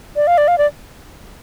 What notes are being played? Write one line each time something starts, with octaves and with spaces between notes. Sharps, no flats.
D5
F5
D5
F5
D5